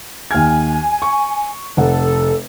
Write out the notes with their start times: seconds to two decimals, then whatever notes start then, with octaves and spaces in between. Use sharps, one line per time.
0.31 D#2 G#5 F6 G#6
1.02 C#6
1.77 F1 A4 F#5